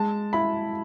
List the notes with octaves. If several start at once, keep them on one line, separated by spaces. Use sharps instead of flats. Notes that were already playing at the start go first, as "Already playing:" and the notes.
Already playing: G#3 A5
E4 B5